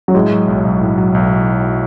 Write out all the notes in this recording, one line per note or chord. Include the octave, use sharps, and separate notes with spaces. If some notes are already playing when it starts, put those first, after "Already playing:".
F#3
A2 G#3
F#3
B1
B1
A2
F#3
B1